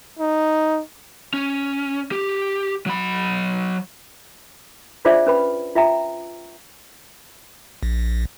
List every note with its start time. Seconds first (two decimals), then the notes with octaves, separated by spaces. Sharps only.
0.19 D#4
1.34 C#4
2.12 G4
2.86 F#3 B5
5.05 D4 F4 G#4 C5 D5 E5
5.27 C#4 B4 B5
5.75 F4 E5 G5 A#5
7.83 A#1